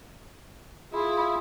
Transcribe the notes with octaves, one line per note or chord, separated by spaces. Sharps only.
E4 F4 G#4